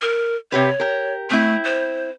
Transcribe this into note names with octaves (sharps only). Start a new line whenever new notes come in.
A#4
C3 G4 B4 C#5
G4 A#4
A3 C4 E4
C5